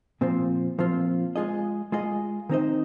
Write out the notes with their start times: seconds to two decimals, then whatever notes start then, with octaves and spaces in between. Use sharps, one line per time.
0.21 A#2 F3 C4 F4
0.79 A#2 F3 C4 F4
1.36 G#3 F4 G#4 D#5
1.92 G#3 F4 G#4 D#5
2.49 D#3 C4 D#4 C5 D#5